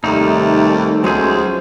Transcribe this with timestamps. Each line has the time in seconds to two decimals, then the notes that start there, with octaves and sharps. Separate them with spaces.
0.04 D#2 C3 G3 A3 D#4 A5
1.04 C#2 F#3 G#3 A3 G#4 C5